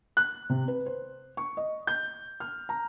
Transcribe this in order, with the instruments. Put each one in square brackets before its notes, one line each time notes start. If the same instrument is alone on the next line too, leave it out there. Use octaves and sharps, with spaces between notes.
[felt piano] F#6
C3
B4
C5
C#6
D#5
G6
F6
A#5